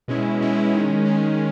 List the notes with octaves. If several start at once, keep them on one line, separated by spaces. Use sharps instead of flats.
B2 G#3 C#4 E4
B2 G#3 C#4 E4
D#3 G#3 C#4
D#3 G#3 C#4